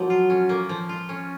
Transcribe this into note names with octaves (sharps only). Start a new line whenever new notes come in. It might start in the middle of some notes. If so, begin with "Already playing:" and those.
Already playing: F3 F#3 A#3
F4
C#4
A#3
F3
F4
C#4